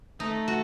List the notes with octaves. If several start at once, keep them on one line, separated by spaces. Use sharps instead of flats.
A3 D#4
F#4